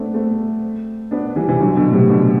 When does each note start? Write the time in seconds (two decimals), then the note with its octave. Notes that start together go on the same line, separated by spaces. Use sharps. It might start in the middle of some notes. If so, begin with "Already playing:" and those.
Already playing: A3 B3 C4 D4
0.14 A3 C4
1.11 B3 D4
1.36 E3 G3
1.48 C3 E3
1.60 D3 F#3
1.76 B2 D3
1.92 A2 C3
2.09 B2 D3